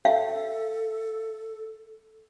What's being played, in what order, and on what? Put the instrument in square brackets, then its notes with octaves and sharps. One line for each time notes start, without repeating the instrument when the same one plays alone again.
[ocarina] A4 [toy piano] E5 F5